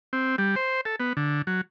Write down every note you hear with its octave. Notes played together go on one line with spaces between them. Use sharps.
C4
G3
C5
A4
B3
D3
F#3